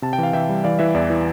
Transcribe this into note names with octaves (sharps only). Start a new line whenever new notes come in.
C3 A5
G5
E3 F5
E3 E5 G5
G3
E3 D5 F5
E3 E5
E2 D5
E3